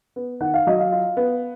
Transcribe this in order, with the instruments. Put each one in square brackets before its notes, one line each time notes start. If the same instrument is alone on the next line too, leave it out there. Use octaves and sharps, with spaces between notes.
[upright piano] B3
[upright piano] D#3 [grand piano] F#5
[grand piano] F5
[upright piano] F#3 [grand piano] D#5
[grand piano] F5
[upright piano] F4
B3